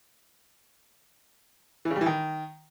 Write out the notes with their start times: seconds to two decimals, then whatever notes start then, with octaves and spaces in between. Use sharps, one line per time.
1.85 E3
1.90 C#3
1.96 G3
2.01 E3
2.06 D#3